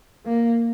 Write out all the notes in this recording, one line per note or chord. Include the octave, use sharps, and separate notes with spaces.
A#3